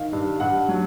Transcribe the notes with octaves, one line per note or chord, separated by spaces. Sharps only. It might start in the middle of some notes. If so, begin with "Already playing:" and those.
Already playing: D#3 F5
G2
G2 F#5
F#3